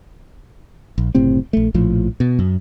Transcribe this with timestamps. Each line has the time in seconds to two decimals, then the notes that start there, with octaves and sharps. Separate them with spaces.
0.98 A#1
1.15 F#1 A2 C3 C4
1.53 A#1 A3
1.74 A#1 A2 F3
2.20 B2
2.39 F#2